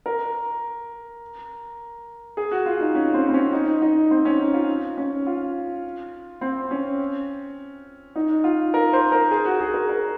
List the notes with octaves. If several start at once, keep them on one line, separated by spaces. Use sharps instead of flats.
A#4
G#4
F#4
F4
D#4
C#4
C4
C4
C#4
D#4
D#4
C4
C#4
D#4
F4
C#4
F4
C4
C#4
D#4
F4
A#4
C5
A#4
G#4
F#4
G#4
A#4
A#4